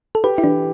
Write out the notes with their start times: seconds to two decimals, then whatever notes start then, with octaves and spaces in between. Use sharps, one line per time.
0.15 A4
0.24 G4 B4
0.38 E4
0.43 E3 D4